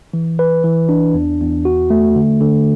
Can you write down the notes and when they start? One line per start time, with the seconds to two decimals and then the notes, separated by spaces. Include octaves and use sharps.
0.14 E3
0.39 B4
0.64 E3
0.89 D4
1.14 E2
1.41 E2
1.65 F#4
1.90 A3
2.15 D3
2.41 D3